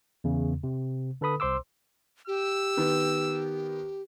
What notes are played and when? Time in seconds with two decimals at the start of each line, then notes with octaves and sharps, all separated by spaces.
0.24 E2 C#3
0.63 C3
1.21 D3 A4 B4 B5 D#6
1.40 C2 C5 C6 D6 E6
2.28 G4 E6
2.77 D#3 B3